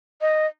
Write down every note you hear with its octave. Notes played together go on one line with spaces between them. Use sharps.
D#5